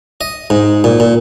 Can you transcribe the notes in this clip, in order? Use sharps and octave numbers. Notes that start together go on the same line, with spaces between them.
D#5
G#2
A#2
A#2